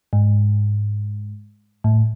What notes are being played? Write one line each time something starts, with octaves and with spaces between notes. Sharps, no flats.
G#2
A2